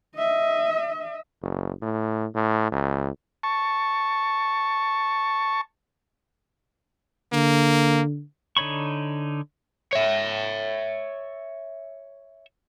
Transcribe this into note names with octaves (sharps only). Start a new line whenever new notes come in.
D#5 E5
F#1
A2
A2
C#2
A5 C#6
D3 A#3
D3 D#4 C#5 B5 C#6
C#5 E5